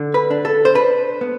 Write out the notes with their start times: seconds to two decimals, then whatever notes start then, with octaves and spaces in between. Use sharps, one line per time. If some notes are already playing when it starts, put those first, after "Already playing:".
Already playing: D3
0.14 B4
0.31 D4
0.45 A4
0.65 C5
0.75 D4 B4
1.21 B3